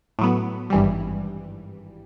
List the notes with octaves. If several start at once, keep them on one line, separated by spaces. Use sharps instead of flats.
A2 F#3 B3
G#1 G2 E3 G3